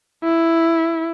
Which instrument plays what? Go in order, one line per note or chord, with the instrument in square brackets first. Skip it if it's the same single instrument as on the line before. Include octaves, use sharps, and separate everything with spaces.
[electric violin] E4